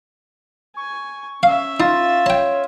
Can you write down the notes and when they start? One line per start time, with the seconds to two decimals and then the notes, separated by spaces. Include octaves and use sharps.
0.77 G#5 C#6
1.43 C#4 E5 F5
1.80 D#4 F4 A6
2.26 C#5 G5 A5